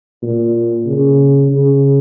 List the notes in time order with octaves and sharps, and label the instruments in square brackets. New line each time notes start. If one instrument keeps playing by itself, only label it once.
[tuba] A#2
C#3
C#3